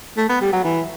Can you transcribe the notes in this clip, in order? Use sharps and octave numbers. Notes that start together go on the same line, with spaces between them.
A3
B3
G3
F#3
E3